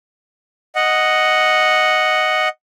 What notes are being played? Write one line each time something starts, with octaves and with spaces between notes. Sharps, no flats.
D#5 F#5